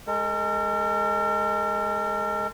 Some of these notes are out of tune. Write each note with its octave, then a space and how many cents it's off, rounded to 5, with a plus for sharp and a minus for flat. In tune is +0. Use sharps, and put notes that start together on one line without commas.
G#3 +0 A#4 -45